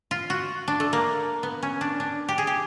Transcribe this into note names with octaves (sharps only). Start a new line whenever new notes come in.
F4
F#4
D4
A3
A#3
B3
C#4
D4
D4
G4
G#4
G4